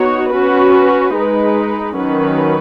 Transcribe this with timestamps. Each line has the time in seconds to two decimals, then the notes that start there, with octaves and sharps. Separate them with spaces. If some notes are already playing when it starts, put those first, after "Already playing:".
Already playing: B3 D#4 F#4 C#5
0.30 C#4 F#4 B4
1.14 G#3 D#4 B4
1.97 D#3 F#3 C#4 B4